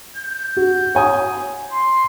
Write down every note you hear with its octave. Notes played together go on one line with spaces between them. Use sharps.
G6
F#4
C#5 G#5 D#6
C6